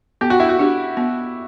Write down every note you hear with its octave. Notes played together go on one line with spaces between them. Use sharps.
B3 G4
F#4
E4
F#4
D4 G4
B3